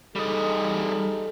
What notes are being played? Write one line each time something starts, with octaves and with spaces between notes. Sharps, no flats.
G3 D#4 G#4 A4 D#5